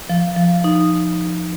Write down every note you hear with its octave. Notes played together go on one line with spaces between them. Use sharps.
F3
F3
D#4